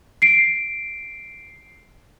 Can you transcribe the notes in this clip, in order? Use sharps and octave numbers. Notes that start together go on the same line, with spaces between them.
C7 D7